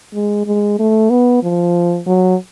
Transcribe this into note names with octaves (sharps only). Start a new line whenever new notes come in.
G#3
G#3
A3
B3
F3
F#3